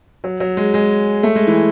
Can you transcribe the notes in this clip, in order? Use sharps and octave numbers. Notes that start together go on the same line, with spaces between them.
F#3
F#3
G#3
G#3
A3
G#3
E3